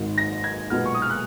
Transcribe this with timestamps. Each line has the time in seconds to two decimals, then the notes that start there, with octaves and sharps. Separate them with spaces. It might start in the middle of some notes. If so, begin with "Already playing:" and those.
Already playing: G#1 G#2 D#3
0.18 A#6
0.44 G#6
0.70 B1 A#2 G#3 B3 F6
0.86 C#6
0.94 D#6
1.02 F6
1.10 F#6